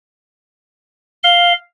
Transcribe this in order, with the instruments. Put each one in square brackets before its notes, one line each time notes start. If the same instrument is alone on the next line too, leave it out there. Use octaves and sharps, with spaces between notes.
[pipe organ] F5 [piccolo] G7